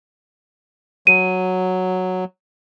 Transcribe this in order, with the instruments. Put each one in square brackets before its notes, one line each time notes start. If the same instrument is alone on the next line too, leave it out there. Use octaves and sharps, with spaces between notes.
[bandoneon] F#3 [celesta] D#7